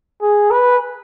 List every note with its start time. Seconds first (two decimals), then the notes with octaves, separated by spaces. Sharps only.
0.22 G#4
0.51 B4